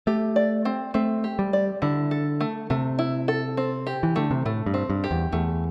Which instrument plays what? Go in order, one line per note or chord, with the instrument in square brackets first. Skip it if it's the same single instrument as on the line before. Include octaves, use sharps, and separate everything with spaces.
[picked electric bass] A3 [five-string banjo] G4
[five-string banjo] D5
C4
[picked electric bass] A3 [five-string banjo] C4
[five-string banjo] G4
[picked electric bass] G3
[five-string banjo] D5
[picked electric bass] D3 [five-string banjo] E4
[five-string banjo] A4
A3
[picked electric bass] C3 [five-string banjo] A3
[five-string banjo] E4
A4
C4
G4
[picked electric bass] E3
[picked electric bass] D3 [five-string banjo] A3
[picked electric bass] C3
[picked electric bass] A2 [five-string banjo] A3
[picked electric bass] G2
[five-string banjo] C4
[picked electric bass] G2
[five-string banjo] G4
[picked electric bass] E2
[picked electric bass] E2 [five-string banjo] A3